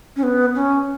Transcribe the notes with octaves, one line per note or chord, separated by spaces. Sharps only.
C#4
B3
C#4